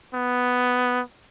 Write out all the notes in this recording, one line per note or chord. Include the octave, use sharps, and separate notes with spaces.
B3